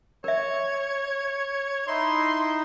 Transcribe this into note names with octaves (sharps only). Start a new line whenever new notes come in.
A#4 C#5 E5
D#4 E4 C6